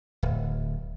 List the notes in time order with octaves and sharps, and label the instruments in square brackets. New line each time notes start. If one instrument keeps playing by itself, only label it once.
[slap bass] D1